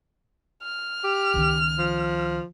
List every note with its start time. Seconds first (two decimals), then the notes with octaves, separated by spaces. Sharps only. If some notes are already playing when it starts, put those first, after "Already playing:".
0.63 F6
1.04 G4
1.34 C#2 D#3
1.78 F3